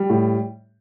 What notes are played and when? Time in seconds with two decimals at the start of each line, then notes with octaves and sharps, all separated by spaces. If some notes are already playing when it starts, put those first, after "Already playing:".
Already playing: G3
0.10 A2